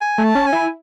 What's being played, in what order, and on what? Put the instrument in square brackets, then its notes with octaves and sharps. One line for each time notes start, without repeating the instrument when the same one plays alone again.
[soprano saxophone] G#5
[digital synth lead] A3
[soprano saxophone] A5
[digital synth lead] C#4
[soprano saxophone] G#5
[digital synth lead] E4